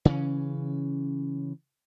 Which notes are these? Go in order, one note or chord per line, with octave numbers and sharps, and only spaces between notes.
C#3 E3 C#4